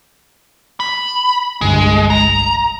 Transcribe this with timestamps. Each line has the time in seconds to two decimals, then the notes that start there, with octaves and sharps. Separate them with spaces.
0.80 B5
1.61 G1 C2 G2 G#3
2.10 A#5